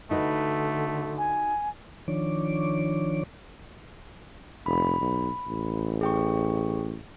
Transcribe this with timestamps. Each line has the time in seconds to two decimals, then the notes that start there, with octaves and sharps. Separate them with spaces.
0.11 D3 A3 D#4 F#4 B4
1.18 G#5
2.08 D#3 F3 D4 C#5 D6
4.66 F1 B5
5.01 B1
5.48 A1
6.01 G#4 G5 C#6